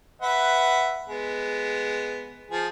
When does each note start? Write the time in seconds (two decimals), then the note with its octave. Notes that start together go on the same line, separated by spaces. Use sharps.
0.22 B4 E5 F#5
1.09 G#3 B3
2.51 F3 G#4